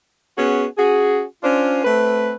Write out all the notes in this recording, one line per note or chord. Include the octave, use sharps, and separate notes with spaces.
B3 C#4 F#4 G#4
C#4 F#4 G#4
C#4 D4 F4 C5
A3 C4 B4